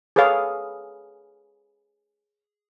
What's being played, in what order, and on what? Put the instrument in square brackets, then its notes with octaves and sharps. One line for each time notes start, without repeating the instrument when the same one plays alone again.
[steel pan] G#4 A4 B4 C#5 F5